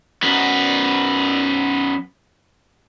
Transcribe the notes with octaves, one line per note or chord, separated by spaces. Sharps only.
F#2 B3